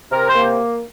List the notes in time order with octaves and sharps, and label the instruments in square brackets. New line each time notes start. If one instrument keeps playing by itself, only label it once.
[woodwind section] C3 A#4
C5
A#3